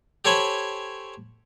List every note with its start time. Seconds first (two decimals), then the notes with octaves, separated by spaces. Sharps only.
0.25 G4 A4 C5 C#5 G#5 B5